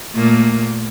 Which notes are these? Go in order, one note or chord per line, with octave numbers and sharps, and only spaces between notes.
A#2 A3 A#3